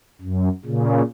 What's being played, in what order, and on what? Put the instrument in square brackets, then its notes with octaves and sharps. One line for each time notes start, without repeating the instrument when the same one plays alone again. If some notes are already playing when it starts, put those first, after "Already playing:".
[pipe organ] F#2
A#2 C#3